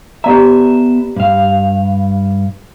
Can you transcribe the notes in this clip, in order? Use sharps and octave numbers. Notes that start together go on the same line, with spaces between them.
B3 G4 D5 E5 A#5
G2 F5